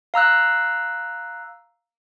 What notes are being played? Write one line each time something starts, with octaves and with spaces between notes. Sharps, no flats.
F5 A#5 E6 F#6